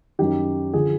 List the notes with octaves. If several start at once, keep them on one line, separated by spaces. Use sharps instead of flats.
F#2 D#3 G4
D3 F3 G#4